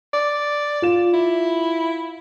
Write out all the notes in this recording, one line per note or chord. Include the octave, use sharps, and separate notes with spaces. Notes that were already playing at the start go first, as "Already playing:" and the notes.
D5
F4 E7
E4